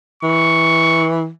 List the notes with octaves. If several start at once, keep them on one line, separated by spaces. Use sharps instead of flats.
E3 C#6